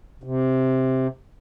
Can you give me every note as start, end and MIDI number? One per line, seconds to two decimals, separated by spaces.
0.23 1.07 48